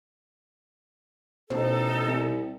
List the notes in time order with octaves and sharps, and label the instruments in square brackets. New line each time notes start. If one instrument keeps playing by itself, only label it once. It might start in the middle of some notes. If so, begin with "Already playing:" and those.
[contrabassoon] A1 [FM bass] B2 [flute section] D#4 A4 [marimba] C5
[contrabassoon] C2